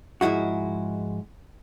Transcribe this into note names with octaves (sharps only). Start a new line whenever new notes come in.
G#2 F3 G#3 E4 F#4